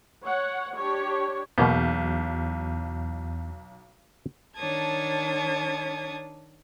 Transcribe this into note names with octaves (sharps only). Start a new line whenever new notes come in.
C#5 F#5
D4 G4 C#5
B1 E2 B2 A#3 B3 F6 G6
D#3 D4 C#5 A5 D#6 G#6